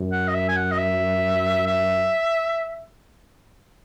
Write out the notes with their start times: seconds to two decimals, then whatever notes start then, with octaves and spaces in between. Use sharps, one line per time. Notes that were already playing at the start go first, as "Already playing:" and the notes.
Already playing: F#2
0.12 F#5
0.28 D#5
0.34 E5
0.49 G#5
0.56 F#5
0.71 D#5
0.78 E5
1.67 E5